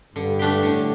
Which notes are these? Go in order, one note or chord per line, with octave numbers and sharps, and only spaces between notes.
G2 D3
A3 D4 G4
A2 D3